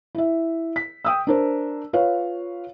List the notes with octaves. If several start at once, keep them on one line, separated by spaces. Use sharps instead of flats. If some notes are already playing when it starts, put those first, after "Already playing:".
E4 E5
B6
G5 D#6 E6
D4 A#4 C5
F4 B4 C#5 F5